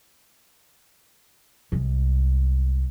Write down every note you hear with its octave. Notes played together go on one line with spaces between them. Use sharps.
C2 G#3